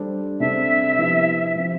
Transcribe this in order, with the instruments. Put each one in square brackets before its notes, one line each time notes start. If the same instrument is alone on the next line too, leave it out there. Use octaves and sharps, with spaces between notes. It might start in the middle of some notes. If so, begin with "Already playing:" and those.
Already playing: [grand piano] G3 D4 A4 C5
[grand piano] C3 G3 D4 A4 C5 [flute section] E5
[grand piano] F3 B3 E4 G4
F3 C4 E4 G4